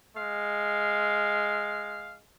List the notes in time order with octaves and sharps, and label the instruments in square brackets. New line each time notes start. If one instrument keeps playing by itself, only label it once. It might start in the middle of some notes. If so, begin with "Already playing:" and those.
[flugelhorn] G#3 [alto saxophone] F5